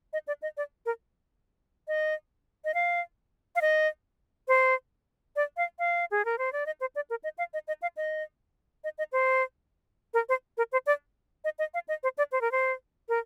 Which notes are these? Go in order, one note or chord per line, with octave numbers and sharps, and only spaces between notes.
D#5
D5
D#5
D5
A#4
D#5
D#5
F5
F5
D#5
C5
D5
F5
F5
G#4
A#4
C5
D5
D#5
C5
D5
A#4
D#5
F5
D#5
D#5
F5
D#5
D#5
D#5
C5
A#4
C5
A#4
C5
D5
D#5
D#5
F5
D#5
C5
D5
C5
A#4
C5
A#4